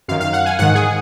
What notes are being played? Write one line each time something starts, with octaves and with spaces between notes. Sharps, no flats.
F#2 D#3 F5
F5
F#5
G#5
G#2 D#3 F#5
G#4